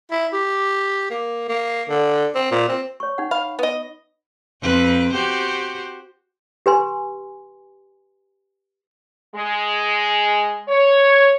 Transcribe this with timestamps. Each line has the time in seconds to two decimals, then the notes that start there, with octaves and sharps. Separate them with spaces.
0.11 E4
0.33 G4
1.10 A#3
1.48 A#3
1.89 D3
2.35 C4
2.51 A#2
2.68 C4
3.00 C#5 C#6
3.18 D#4 F#5
3.31 F5 B5
3.59 B3 D#5
4.62 F2 C4 B4
5.13 F#4 G4 C5
6.66 G4 B4 G#5 C6
9.36 G#3
10.69 C#5